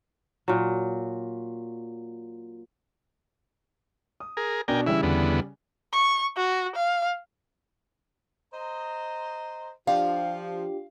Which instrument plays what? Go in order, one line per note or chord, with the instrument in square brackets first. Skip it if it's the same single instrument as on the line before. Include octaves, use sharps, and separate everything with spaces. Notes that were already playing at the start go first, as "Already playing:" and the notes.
[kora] A#2 F#3
[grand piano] D#6
[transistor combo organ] G#4 A#4
[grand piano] B2 D4 [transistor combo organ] A#4 G5 G#5
[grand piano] C#3 G3 [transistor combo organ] E3 E4
[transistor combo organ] E2 D3 B3
[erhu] C#6
F#4
F5
[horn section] C5 D#5 A#5
[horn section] F3 [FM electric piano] D4 F4 G4 [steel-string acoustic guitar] F5